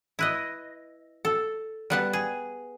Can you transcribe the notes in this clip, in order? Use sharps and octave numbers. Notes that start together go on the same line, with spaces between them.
E4 B4 D#5
A4
G3 B3 A5
G#4